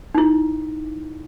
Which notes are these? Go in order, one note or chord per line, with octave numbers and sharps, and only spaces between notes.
D#4 E4